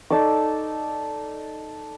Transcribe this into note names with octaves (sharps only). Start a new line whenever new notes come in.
D#4 A4 D5 D6